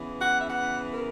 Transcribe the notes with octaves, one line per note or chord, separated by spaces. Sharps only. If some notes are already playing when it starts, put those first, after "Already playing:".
Already playing: C#3 E3 B3
F#5
E5
F#5
A#4